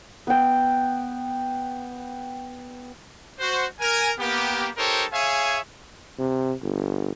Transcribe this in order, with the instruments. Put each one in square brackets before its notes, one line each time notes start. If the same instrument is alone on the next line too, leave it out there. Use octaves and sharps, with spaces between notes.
[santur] B3 G5
[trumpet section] F#4 C5
A#4 G#5
A#3 B3 G4
D#4 G4 A4 A#4 C5 C#5
G#4 C#5 E5 F5 G#5
[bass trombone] C3
G1